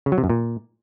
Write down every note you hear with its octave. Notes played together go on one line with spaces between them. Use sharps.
C#3
F#3
C3
F#2
A#2